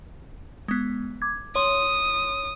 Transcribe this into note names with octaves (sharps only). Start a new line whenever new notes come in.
G#3 B3
D6 G#6
C#5 C6 D#6